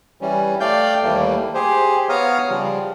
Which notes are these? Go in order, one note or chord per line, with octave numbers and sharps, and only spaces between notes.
E3 G3 C#4
A3 D5 F5 G5 G6
D#2 E3 G3 A3 A#3
G4 G#4 C5
B3 C#5 F5 A#5 D#6 F6
C#3 F3 G3